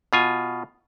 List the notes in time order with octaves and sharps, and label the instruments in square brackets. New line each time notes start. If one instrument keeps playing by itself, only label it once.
[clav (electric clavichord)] B2 F4 G#5